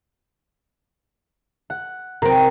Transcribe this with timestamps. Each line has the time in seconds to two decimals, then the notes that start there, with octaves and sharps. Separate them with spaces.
1.70 F#5
2.22 C3 C4 A#4